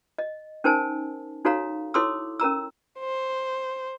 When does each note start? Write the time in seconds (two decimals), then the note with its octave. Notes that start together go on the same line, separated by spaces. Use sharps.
0.19 D#5
0.64 C#4 D#4 A#4 C5 G#5 A5
1.45 D#4 F#4 A4 C#5 F5 A#5
1.94 E4 A4 C#5 C6 D6 E6
2.40 C#4 A#4 A#5 E6
2.99 C5